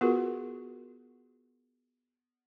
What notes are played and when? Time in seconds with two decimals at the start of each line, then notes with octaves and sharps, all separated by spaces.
0.01 B3 F4 F#4 G#4 A#4 B4